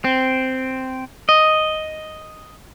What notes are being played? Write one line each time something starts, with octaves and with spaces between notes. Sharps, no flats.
C4
D#5